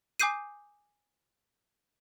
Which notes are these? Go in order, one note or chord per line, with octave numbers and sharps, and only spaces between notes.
G#5 D6 D#6 G6 C7 D#7